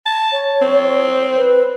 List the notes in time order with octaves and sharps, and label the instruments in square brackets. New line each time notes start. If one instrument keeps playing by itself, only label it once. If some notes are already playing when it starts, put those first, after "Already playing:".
[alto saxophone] A5
[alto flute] C#5
[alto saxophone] C4
[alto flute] B4